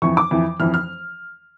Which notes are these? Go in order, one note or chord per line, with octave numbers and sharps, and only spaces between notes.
F2 E3 C#6
D6
F2 E3
F2 E3 F6
F6